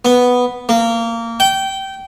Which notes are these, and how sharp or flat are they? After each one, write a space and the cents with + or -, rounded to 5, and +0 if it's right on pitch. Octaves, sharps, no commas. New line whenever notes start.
B3 +0
A#3 -20
G5 -20